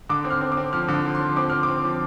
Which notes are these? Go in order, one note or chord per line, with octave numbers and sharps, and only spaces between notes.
D3 D6
C4
F6
C4
D6
C4
F3 F6
D3
D6
F3
C6
F3
C4 D6
C4 F6
D6
C4
F3